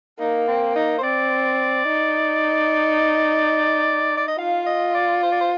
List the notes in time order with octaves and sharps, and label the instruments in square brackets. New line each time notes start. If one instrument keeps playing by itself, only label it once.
[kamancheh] A#3 [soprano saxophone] D#4
[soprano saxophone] C4
D#4
C5
[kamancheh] C4 [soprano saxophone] D5
[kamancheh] D#4
[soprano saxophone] D5
D#5
[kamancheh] F4 [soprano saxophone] F5
[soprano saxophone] D#5
D5
C5
D5
C5